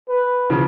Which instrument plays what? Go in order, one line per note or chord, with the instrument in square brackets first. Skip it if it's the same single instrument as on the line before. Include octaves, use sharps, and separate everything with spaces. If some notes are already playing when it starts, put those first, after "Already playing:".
[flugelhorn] B4
[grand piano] C#3 F3